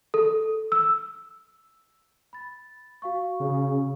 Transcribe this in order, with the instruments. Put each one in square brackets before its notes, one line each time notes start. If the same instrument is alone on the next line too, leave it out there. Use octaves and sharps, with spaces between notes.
[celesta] A4
E6
B5 A6
F#4 F5 C#6
[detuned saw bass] C#3